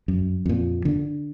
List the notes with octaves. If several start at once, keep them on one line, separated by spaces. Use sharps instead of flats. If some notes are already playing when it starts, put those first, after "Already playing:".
F#2
F2 A#2
D3 D4